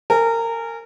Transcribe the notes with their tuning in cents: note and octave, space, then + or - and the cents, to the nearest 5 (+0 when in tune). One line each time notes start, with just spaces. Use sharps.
A#4 -25 G#5 +0